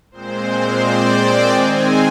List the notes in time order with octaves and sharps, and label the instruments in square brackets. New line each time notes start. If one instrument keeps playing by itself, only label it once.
[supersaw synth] A#2 G#3 C4 C5
C5
D5
G5
D#3 G#3 C4 G#5